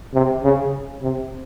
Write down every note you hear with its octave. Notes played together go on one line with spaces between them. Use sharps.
C3
C#3
C3